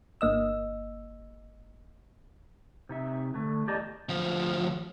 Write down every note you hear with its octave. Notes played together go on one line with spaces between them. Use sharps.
G1 A#3 D#5 E6
C3 D#4 E5
D3 A3
E2 G4 D5 D#5 A5 A#5
D2 F3